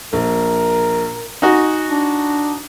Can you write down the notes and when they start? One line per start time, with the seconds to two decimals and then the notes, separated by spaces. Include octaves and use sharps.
0.13 A#1 A#4
1.42 D#4 F#4 G#5
1.91 D4